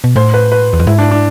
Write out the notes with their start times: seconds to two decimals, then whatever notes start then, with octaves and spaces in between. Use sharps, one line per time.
0.04 B2
0.16 A2 C5
0.34 B4
0.52 B4
0.73 E2
0.79 F2
0.87 G#2 E4
0.99 D4
1.11 D4